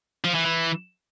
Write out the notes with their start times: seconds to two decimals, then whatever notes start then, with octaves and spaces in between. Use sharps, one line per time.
0.24 F3
0.35 E3
0.45 E3